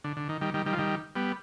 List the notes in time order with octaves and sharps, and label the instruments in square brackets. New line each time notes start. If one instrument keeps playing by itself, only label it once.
[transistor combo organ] D3
D3
D#3
D#3 G3
D#3 G3
D#3 G3
F3
D#3 G3
G3 B3